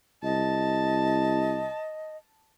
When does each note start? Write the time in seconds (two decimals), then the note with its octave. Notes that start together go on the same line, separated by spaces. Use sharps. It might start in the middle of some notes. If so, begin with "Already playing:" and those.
0.24 C2 D#5 A5